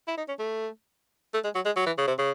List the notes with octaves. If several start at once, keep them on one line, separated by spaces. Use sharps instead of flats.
E4
D#4
C#4
A3
A3
G#3
F#3
G#3
F#3
E3
C#3
C3
C#3